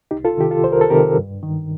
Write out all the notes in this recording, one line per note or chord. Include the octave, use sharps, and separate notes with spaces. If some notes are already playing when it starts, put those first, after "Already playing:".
C2 D#4 G4
F4 A4
C3 D#3 G4
F4 A4
C2 C5
A#4
A4
C3 D#3 G4 A#4
G2
D#3